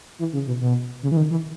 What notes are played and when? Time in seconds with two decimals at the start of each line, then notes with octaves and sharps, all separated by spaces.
0.19 E3
0.33 C#3
0.47 B2
0.61 B2
1.03 C#3
1.12 E3
1.17 D#3
1.30 E3